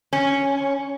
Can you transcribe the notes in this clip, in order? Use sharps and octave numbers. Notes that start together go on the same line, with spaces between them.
C#4